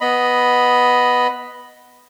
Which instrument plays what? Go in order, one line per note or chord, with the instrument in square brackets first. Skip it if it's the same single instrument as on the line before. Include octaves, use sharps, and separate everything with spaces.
[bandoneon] B3 D#5 B5